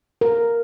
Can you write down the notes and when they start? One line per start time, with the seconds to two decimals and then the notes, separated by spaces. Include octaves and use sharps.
0.21 A#4